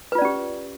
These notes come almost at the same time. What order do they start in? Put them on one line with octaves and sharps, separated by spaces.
B4 F4 D5 C#4 G4